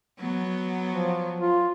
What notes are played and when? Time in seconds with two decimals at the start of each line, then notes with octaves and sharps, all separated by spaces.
0.18 F#3 B3
0.90 F3
1.40 F4